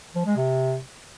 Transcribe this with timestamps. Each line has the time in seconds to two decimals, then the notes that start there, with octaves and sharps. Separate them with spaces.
0.15 F3
0.26 G#3
0.37 C3